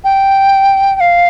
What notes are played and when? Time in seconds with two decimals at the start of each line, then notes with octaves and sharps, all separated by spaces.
0.04 G5
0.96 G5
1.00 F5